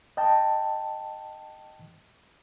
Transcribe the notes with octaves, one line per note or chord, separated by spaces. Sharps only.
D#5 G5 A5